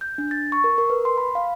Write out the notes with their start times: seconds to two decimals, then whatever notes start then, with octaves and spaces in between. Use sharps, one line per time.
0.01 G6
0.18 D4
0.31 A6
0.52 C#6
0.64 A#4
0.78 A#4
0.90 B4
1.05 C6
1.18 B5
1.35 F5